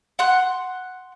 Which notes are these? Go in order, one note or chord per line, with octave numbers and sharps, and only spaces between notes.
F#5 C6 F#6